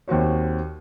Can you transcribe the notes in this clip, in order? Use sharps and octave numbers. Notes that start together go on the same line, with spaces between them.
D#2 C4 F#4 C#5